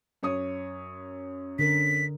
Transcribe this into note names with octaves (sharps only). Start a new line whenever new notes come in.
F#2 C#5 D#6
D3 A#4 B6